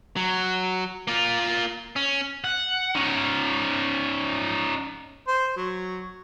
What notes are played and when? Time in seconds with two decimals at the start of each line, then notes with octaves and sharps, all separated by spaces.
0.16 F#3
1.07 A#3 F4
1.96 C#4
2.44 F#5
2.95 C#4 D#4
5.28 C5
5.57 F#3